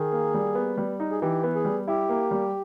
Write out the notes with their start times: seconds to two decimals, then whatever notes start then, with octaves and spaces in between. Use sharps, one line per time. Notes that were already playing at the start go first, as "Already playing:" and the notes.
Already playing: D#3 G#4
0.12 A#3
0.34 G3
0.55 B3
0.78 G3
1.00 D#4
1.11 G#4
1.21 E3 G4
1.43 B3
1.55 G#4
1.65 G3
1.87 E4 G4
2.09 A#3
2.31 G3